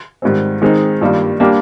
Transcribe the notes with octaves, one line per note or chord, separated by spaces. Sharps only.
G#2 D#3 G3 C4
D#3 G#3 C4 D#4
G2 D#3 G3 A#3 F4
G3 A#3 D4 G4